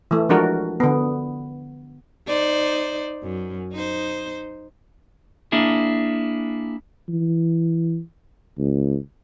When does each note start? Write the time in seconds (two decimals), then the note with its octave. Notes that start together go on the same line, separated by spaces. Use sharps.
0.11 E3 A3
0.29 F3 G#3 D4 F#4 A#4
0.80 D3 B3
2.27 D#4 C5 D5
3.23 F#2
3.72 D#4 C5
5.52 A#3 D4 E4 G#4
7.08 E3
8.58 C#2